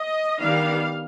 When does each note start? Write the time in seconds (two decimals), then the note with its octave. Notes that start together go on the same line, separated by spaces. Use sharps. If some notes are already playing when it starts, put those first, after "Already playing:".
Already playing: D#5
0.40 D#3 G3 B3 D4 F5